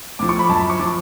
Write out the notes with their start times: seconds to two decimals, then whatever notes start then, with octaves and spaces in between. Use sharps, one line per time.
0.19 A2 F3 D6
0.29 C#6
0.39 B5
0.49 F#2 F3 A5
0.60 B5
0.70 C#6
0.79 F3 D6